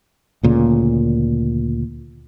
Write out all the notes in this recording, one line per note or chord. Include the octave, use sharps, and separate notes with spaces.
D2 A#2 C#3